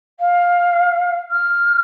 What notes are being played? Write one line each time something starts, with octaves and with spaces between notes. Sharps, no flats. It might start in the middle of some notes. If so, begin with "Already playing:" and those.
F5
F6